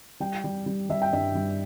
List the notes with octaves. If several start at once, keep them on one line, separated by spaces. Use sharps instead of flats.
G3 G5
G3
G3
G3 E5
G5
G2 E5
G3